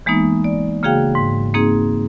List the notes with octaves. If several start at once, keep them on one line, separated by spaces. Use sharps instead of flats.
E3 G#3 A#3 B3 D#4
D5
C#3 A#3 F#4 G#4 F5 G5
G#2
A#3 C4 D#4 G#4